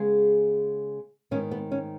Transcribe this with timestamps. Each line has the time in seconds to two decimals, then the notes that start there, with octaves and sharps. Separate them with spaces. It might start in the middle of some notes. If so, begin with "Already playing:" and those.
Already playing: C#3 G#3 B3 G#4
1.31 G#2 D#3 B3 C#4
1.51 B3
1.71 C#4